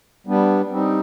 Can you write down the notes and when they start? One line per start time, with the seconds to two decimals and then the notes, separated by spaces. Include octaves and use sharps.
0.27 G3 B3 D4
0.70 G3 C4 D#4